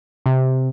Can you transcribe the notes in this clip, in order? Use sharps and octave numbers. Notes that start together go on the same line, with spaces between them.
C3